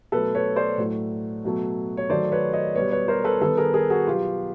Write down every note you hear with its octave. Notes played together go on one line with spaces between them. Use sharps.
B2 F#3 A3 A4 B4
B4 C#5
C5 D5
A2 F#3 A3
B2 F#3 A3
C#5
D#3 F#3 A3 C5 D5
B4 C#5
C#5 D#5
B2 G3 B3 B4 C#5
B4 C#5
A#4 C5
A4 B4
D#3 G3 B3 A4 B4
G#4 A#4
G#4 A#4
F#4 G#4
B2 F#3 B3 F4 G4